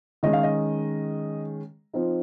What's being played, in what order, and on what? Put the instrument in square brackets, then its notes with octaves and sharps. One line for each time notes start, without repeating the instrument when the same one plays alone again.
[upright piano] D#3 G#3 C#4 D#5
F5
D#5
F3 C4 D#4